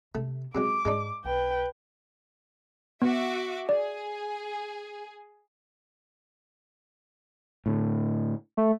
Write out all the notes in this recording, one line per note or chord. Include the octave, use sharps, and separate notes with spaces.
C3 A3
C3 F#3 G#3 C#4 D6
G#2 G#3 D4 D#4
B1 B4 G5
B3 F#4 E5 D6
G#4 D5
A2 D3
A3